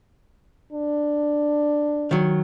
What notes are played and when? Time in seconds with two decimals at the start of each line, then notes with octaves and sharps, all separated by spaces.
0.73 D4
2.11 D#3 F#3